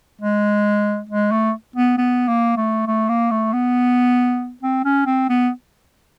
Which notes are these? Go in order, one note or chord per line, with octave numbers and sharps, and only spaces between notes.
G#3
G#3
A3
B3
B3
A#3
A3
A3
A#3
A3
B3
C4
C#4
C4
B3